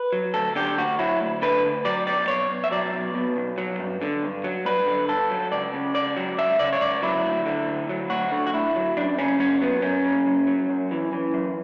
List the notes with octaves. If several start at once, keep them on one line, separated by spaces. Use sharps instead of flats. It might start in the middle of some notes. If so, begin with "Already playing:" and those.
Already playing: B4
F#3
D2 A4
D3 G4
D2 F#4
F#3 E4
D2
D3 B4
D2
F#3 D5
B1 D5
B2 C#5
B1
E5
F#3 D5
B1
B2
B1
F#3
G2
D3
G2
F#3
G2 B4
D3
G2 A4
F#3
C#2 D5
C#3
C#2 D5
F#3
C#2 E5
C#3 D5
C#5
C#2 D5
F#3 E4
D2
D3
D2
F#3
D2 F#4
D3
F#4
D2 E4
F#3
F#2 D4
C#3 C#4
F#2 C#4
F#3 B3
F#2 C#4
C#3
F#2
F#3
F#2
E3
E3
F#2